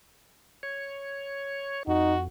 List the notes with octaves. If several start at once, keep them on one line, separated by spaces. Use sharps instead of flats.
C#5
F2 D#4 F#4